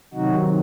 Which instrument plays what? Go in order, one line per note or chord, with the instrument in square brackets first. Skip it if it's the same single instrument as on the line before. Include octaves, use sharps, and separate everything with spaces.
[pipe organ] C3 D#3 F#3 D#4 F#4